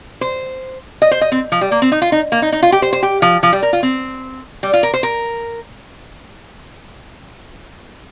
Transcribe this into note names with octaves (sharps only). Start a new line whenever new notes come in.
C5
D#5
C5
D#5
C4
F3
G3
A#3
C4
D#4
F4
D#4
A#3
D#4
D#4
F4
G4
C5
C5
G4
F3
F3
G3
A#4
F4
C4
G3
F4
A#4
C5
A#4